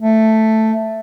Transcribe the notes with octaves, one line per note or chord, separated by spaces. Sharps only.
A3